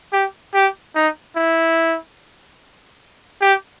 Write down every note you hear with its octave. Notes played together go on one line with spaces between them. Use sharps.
G4
G4
D#4
E4
G4